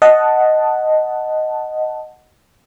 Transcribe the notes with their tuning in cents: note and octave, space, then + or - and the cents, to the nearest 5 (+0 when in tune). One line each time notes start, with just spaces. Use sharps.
D#5 +0 F#5 +0 A5 +0